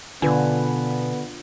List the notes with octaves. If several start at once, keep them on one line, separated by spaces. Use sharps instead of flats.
B2 D3 B3 D4 F4 B4 G#5